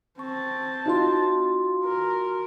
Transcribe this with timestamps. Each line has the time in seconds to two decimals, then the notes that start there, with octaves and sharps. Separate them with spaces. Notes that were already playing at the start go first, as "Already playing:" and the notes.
0.19 C4 A5 C#6
0.86 D#4 F4 F#4 C6
1.85 A#4